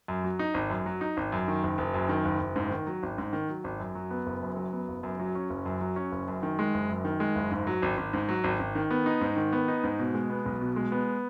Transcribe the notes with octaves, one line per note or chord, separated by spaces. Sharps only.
F#2
F#3
D#4
G#1
F#2
F#3
D#4
G#1
F#2
D#3
F#1
F#1
F#2
D#3
F#1
F#1
G#2
D#3
F#3
G#1
G#2
D#3
F#3
G#1
F#2
F#3
B3
F#1
F#2
F#3
B3
F#1
F#2
F#3
C#4
F#1
F#2
F#3
C#4
F#1
F#2
D#3
G#3
F#1
F#2
D#3
G#3
F#1
G#2
F#3
G#1
G#1
G#2
F#3
G#1
G#1
D#3
B3
D#4
G#2
D#3
B3
D#4
G#2
B2
G#3
B3
B1
B2
G#3
B3